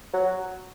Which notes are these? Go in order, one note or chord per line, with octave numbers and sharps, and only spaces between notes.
F#3